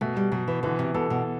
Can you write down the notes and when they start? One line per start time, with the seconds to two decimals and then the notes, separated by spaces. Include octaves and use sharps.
0.01 B2 A3
0.17 G3
0.32 B2 F#3
0.48 E3
0.63 D3 E3
0.79 C3
0.94 B2 A4
1.10 B2